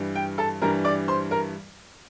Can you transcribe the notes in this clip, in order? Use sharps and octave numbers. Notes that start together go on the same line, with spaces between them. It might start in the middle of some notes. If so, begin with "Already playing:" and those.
Already playing: G2 E3 G3
G5
A4 A5
G2 E3 G3 A#4 A#5
D5 D6
C5 C6
A#4 A#5